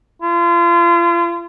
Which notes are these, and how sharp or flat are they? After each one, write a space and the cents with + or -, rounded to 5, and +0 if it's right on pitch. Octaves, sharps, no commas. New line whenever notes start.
F4 -35